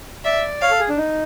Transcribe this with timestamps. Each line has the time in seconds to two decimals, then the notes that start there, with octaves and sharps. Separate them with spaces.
0.24 D5 E5
0.61 C#5 F5
0.71 A4
0.79 G#4
0.89 D4
0.97 D#4